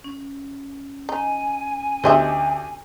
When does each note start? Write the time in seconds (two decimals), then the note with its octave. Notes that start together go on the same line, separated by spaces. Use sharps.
0.04 C#4
1.09 D#4 G#5
2.04 D2 G4 C5 D#5 E5 D#6